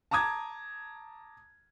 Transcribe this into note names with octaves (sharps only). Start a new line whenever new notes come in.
A5 A#5 D6 D#6 G#6